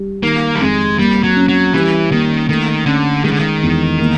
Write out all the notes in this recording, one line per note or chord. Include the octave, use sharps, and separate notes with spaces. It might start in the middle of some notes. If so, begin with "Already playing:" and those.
Already playing: G3
D#3 A#3
G3
F2 G#3
G3 A#3
F#3
C#4
F#3
E3 G3
D#3 A#3
D#3 A3
D3 C#4
D#3 G#3
D3
D#3
E2
A#3